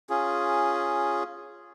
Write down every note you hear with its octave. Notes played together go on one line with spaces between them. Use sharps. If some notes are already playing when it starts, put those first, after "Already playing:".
C#4 F4 G#4